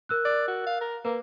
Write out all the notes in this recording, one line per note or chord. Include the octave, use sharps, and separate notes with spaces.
A#4 E6 F#6
D5
F#4
F5
A#4
A#3 B4